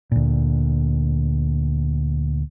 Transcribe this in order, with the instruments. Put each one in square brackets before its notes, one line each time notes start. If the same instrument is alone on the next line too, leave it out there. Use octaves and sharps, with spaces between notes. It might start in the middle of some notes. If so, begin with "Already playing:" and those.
[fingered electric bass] D2 A#2